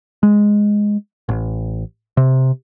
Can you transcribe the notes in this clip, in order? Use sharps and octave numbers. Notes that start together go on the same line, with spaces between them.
G#3
A1
C3